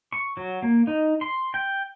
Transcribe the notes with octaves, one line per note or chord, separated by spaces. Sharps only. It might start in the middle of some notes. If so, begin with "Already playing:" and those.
C#6
F#3
A#3
D#4
C6
G5